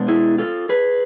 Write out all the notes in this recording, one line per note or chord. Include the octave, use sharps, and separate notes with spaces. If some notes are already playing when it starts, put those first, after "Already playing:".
Already playing: B2 G#3 B3 D4
E4 G#4
F4 A4
G#4 B4